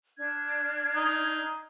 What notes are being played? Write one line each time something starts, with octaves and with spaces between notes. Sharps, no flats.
D4 F6 G#6
D#4